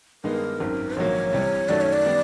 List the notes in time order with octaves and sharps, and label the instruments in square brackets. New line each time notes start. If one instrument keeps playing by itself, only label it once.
[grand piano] G2 D#3 G#3 B3 D#4 [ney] A#4
[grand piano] G#1 F#2 D#3
[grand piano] A#1 G#2 D#3 F#3 A#3 [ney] C#5
[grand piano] C2 C3 E3 G3
[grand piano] F#2 D#3 F#3 A3 C#4 [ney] D5
[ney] C#5
D5
[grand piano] D#3 G3 B3